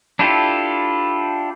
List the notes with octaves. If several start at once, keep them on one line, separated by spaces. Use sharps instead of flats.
D4 E4 F4 G4 A4